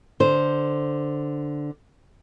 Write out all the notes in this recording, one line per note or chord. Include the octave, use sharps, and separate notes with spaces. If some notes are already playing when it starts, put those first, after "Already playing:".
D3 C5